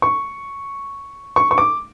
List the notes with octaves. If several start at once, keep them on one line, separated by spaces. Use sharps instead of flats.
C#6
C#6
C#6
D6